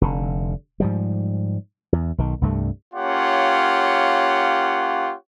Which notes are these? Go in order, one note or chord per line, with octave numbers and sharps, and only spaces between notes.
F1 D3
G#2 F3 G3
E2
B1 D#3
C2 G2 A3
A#3 C#4 F4 G4 C#5 F#5